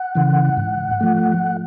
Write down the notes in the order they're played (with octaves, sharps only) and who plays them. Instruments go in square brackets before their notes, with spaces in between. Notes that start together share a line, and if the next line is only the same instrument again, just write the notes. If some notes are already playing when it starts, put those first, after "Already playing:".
Already playing: [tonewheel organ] F#5
C#3 E3
G#2
F3 A3